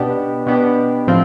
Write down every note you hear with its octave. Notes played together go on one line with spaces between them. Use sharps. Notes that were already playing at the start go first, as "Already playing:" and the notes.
Already playing: B2 B3 D4 G4
B2 B3 D4 G4
A2 F3 C4 F4